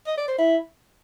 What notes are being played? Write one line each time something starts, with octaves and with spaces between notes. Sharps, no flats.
D#5
D5
C5
E4